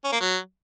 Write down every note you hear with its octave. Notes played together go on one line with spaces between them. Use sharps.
C#4
A#3
F#3